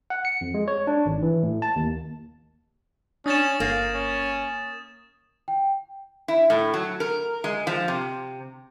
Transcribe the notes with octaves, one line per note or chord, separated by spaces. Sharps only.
F#5
C#7
F2
G#3
C#5
D4
G#1
E3
A2
A5
D#2
C#4 D4 D#6 A6 E7
G1 A#3 F5
C#4
G5
E4
A2
F#3
A#4
G#3
F3
C3